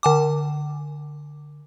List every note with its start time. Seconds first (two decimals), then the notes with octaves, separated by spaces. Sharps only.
0.03 D3 G#5 D6